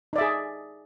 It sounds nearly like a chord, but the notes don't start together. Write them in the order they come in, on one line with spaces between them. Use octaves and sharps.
D#4 D5 E5 G#4